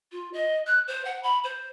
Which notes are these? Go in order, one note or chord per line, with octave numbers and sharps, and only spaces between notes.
F4
D#5
F#6
C5
F#5
B5
C5